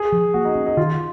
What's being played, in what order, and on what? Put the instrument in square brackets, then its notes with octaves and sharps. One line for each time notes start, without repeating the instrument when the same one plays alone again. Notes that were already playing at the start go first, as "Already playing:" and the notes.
Already playing: [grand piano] G#4
[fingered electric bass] F3
[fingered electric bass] A#3 [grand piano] F#4
[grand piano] D#4
[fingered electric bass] C#4
[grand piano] D#4
[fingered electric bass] D#3 [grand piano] F4